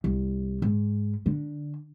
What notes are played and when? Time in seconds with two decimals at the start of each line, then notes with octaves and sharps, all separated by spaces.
0.04 C2
0.62 G#2
1.26 D3